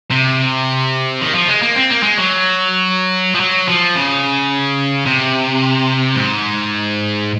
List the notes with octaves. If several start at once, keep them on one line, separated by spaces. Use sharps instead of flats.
C3
D#3
F3
G#3
A#3
C4
A#3
G#3
F#3
F3
F#3
F3
C#3
C3
G#2